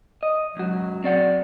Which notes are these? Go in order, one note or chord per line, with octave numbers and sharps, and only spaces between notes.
D#5
C#2 F#3 F#4
C4 D5 F#5